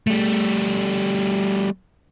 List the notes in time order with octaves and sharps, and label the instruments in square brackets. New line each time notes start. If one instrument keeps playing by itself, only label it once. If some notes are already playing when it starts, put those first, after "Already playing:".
[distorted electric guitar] G3 A3